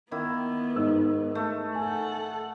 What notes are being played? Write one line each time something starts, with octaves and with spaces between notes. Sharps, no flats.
D#3 A#3 B3 E4
G#2 D#5 E6
A3
A4 F#5 G#5